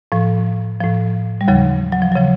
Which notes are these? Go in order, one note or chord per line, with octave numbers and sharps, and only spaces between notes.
A2 F3
A2 F3
G3
D#2 C#3 F3 F#3
F#3
F3
C#3 F3 F#3